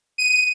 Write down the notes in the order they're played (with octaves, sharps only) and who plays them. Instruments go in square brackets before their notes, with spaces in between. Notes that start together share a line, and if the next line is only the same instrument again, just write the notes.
[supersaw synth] D#7